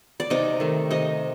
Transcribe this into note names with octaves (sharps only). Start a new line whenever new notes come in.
D5
C3 D#4 D#5
D#3 A3
C3 D#4 D#5